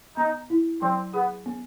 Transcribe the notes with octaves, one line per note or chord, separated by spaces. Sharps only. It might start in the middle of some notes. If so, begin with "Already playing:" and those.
B3 D#4
E4
F#3 C4
B3 G#4
B3